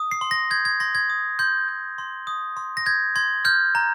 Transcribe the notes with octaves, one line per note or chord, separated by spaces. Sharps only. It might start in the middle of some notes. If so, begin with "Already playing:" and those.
Already playing: D#6
C7
C6
A#6
G6 G#6
G#6
C6 A#6
G#6
D#6
C6 G6
G6
C6
D#6
C6
A#6
G6 G#6
C6 G#6
F6 G6
A#5